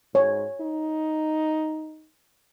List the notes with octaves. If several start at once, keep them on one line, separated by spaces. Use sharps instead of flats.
G#2 C#5
D#4